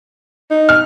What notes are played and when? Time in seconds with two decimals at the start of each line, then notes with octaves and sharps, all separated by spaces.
0.51 D#4
0.69 F6